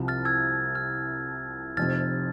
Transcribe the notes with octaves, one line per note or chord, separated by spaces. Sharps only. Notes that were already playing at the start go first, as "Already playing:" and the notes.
Already playing: C2 C3 F3
F6 A6
E6 G#6
F6
F1 F2 C3 F6 A6